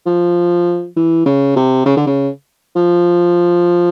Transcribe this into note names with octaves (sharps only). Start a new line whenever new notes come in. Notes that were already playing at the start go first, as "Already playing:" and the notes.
F3
E3
C#3
C3
C#3
D3
C#3
F3